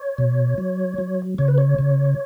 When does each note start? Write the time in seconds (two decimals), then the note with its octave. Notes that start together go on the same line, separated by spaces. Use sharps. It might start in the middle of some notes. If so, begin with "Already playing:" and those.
Already playing: C#5
0.18 B2
0.58 F#3
0.98 F#3
1.38 C#3 C#5
1.48 B4
1.58 C#5
1.79 C#3